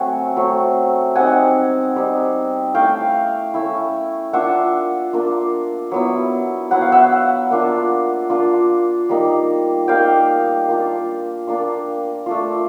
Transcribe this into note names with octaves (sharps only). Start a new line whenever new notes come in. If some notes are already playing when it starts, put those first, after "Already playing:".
Already playing: F#3 A3 C4 F#5 G#5
F#3 A3 C4
G3 C4 D#4 F#5 G#5
G3 C4 D#4
A3 C#4 E4 F5 G5
A3 C#4 E4
A#3 D4 F4 E5 F#5
A#3 D4 F4
F#3 B3 E4
F#3 B3 E4 F#5
F5
E5 F#5
A#3 D4 F4
A#3 D4 F4
G3 A#3 D#4
G3 A#3 D#4 F5 G5
A#3 D4 F4
A#3 D4 F4
A3 D4 F4